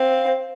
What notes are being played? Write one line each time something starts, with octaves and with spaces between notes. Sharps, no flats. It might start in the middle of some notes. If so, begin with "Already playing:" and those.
Already playing: C4 F5